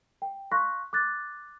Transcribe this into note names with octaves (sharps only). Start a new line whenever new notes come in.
G5
F5 C6 C#6 F#6 A#6 B6
D6 F#6 A6